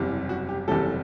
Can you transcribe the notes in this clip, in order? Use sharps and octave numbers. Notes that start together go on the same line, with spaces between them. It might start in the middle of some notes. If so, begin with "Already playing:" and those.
Already playing: F#1 E2 C3 G3
F#4
G4
F#1 E2 C3 G3 A4